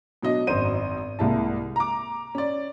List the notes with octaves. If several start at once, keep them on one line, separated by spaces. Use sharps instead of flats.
B2 F#3 D4 D#5
G#1 F#2 C5 D#7
C2 G#3 A#3 E4 A5
A#5 D6
C#4 D5